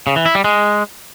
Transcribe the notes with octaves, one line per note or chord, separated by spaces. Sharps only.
C#3
E3
E4
G3
G#3